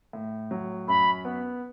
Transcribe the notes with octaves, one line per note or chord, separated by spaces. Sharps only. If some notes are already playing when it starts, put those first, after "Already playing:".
A2
F#3
F#2 B5
B3